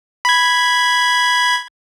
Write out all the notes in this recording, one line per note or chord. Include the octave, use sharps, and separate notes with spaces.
B5 G#6